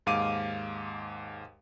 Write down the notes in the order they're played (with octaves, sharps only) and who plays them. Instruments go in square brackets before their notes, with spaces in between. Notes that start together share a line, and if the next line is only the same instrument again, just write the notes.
[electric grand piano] D#2 G#2 F5 D6 D#7